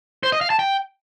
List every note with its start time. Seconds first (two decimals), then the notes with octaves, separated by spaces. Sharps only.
0.23 C5
0.32 D#5
0.41 F5
0.50 A5
0.59 G5